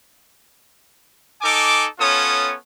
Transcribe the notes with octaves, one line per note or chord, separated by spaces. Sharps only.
D#4 A4 G#5 D6
B3 C#4 F4 A4 C#5 D#6